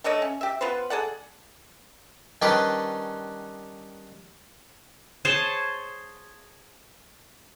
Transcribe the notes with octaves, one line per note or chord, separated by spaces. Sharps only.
A3 D4 C#5 D#5
C#4
G4 E5
B3 F4 B4 C5
G#4 A4 D5 F#5
D#3 G3 C#4 D4 G4 B4
G#4 C5 C#5 A5